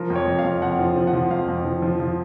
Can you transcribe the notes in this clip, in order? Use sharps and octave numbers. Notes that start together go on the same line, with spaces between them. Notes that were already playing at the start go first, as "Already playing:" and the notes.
Already playing: F3 A#4
F2
C#5
F2
F5
F2
F2 F#5
F3
F3
F#5
F3
F2 F5
F2
F3
F3
F3